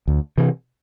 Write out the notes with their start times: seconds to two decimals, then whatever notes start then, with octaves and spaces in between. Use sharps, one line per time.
0.08 D2
0.38 C3 E3